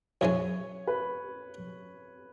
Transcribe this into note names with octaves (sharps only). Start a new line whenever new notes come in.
F#2 E3 G#3 C#4 C#5
B4